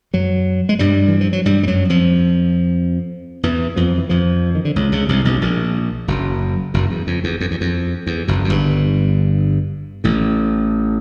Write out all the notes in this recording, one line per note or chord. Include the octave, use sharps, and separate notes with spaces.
F#2 F#3
G#3
G2 G3
E3
F3
F#3
G2 G3
G3
F#2 F#3
F2 F3
E2 E3
F2 F3
E3
F2 F3
D#3
D3
C#2 C#3
C#2 C#3
C2 C3
B1 B2
A2
A#1 A#2
F#1 F#2
F#1 F#2
E2
F2
E2
F2
E2
F2
E2
F#1 F#2
F#2
G1 G2
A1 A2